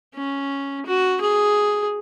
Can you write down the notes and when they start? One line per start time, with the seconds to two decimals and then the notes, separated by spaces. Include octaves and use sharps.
0.15 C#4
0.86 F#4
1.21 G#4